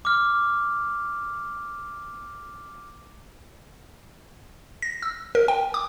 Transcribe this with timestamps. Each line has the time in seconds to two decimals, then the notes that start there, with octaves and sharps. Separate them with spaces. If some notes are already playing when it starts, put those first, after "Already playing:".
0.05 D6 F6
4.82 A#6
5.03 E6
5.35 A#4
5.48 G5
5.74 D6